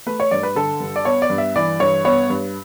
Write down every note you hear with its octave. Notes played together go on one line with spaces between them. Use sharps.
A3 B4
C#5
G2 D5
B4
D3 A4
G2
D5
B3 C#5
D5
G2
E5
E3 D5
G2 C#5
B3 C#5
G2